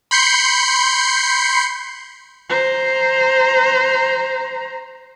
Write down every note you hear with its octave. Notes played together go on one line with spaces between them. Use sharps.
B5 C6 G6 C7 C#7
C5 A#5